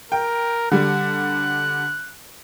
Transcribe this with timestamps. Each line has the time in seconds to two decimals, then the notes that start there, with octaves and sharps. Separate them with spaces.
0.12 A#4 G5
0.71 D3 G3 F#6